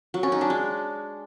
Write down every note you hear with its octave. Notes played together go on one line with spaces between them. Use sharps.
F#3
C#4
D#4
D4
G#3